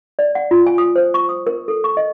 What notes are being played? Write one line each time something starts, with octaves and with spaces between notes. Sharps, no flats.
D5
F#5
F4
G#5
D#6
C5
C#6
D#6
A#4
A4
C#6
D#5